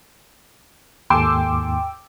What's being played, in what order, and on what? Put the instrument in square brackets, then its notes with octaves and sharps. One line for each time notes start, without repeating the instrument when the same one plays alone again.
[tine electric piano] D#2 G#2 [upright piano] A4 G#5 C6 [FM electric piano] G5 D6 E6